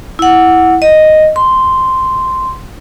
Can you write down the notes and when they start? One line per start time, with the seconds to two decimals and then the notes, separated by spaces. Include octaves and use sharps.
0.19 E4 F#5
0.82 D#5
1.36 C6